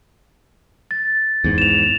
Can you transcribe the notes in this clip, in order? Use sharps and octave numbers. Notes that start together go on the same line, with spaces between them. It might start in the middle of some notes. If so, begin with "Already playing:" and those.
A6
E2 G#2
E7 F7